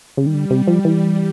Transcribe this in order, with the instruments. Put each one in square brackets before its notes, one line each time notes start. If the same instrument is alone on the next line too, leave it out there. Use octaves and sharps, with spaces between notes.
[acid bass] C#3 [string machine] G3
[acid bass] D#3
D3
C3
F3
E3